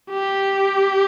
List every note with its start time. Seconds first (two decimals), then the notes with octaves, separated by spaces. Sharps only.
0.10 G4